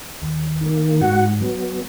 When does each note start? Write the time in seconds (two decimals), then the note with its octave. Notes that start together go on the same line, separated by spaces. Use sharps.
0.22 D#2
0.61 D#3 A#3
1.01 G#2 F#4 F#5
1.41 F#3 B3